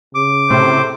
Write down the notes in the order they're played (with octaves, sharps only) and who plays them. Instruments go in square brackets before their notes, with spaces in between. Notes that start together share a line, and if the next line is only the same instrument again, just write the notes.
[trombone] C#3 [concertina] D6
[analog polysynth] A2 C3 [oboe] C5